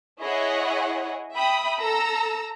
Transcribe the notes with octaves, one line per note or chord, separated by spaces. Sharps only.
E4 G#4 C#5 D#5 F#5
E5 G5 B5 D#6
A4 A#5 E6